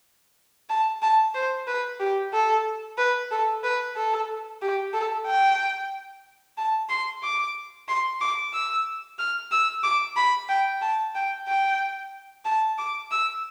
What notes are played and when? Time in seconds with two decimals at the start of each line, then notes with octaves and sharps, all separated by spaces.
0.69 A5
1.02 A5
1.35 C5
1.67 B4
2.00 G4
2.33 A4
2.98 B4
3.31 A4
3.64 B4
3.96 A4
4.62 G4
4.94 A4
5.27 G5
6.58 A5
6.90 C6
7.23 D6
7.88 C6
8.21 D6
8.54 E6
9.19 F6
9.52 E6
9.84 D6
10.17 B5
10.49 G5
10.82 A5
11.15 G5
11.48 G5
12.45 A5
12.78 D6
13.12 E6